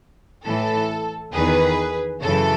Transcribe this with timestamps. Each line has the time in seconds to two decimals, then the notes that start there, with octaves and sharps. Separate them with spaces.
0.44 A2 E3 A4
1.33 E2 D#3 G#4 B4
2.22 F#2 C#3 E3 A4